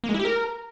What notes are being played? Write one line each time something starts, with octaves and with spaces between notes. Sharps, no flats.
A#3
G#3
E4
G4
A#4